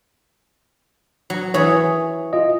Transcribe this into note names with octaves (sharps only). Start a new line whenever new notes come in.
F#3
E3 G#4 C#5
F4 D#5